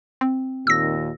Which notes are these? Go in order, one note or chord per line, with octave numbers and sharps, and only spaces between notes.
C4
D#2 A#2 D#3 E6 A#6